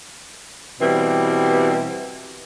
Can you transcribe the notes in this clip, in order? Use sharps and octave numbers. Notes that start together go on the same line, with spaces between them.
B2 E3 G3 C4